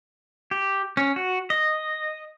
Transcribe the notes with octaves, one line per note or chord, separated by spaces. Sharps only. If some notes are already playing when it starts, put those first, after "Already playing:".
G4
C#4
F#4
D#5